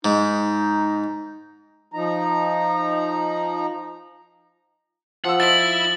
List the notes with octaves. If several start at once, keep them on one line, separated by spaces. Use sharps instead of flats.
G#2 D#4
F3 D#4 A#5
F3 F#5 E6
E4 D#5 A6 F#7